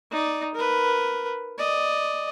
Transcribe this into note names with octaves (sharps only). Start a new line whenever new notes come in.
D#4 D5
A#4 B4
D5 D#5